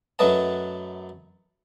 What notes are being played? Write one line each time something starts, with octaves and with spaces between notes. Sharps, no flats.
F#2 F#3 A3 B4 D#5 A5